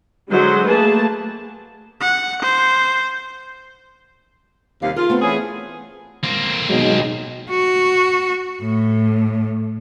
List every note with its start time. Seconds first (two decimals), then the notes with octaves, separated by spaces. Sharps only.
0.30 D3 F#3 G#3 C5 D#5
0.69 A3 A#3 G#4 B4 A5
2.01 F#5
2.42 C5
4.82 D#2 C3 G3 F5
4.96 F4 G#4 A#4
5.10 A3 B3 C4
5.21 E3 C#4 G#4
6.23 A#3 C4
6.70 B2 F#3 G#3 D#4 D#5
7.50 F#4
8.62 A2